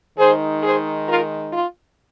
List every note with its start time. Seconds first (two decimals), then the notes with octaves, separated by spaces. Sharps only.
0.17 D#3 G#3 D#4 G#4 C5
0.62 G#4 C5
1.07 F4 A#4
1.51 F4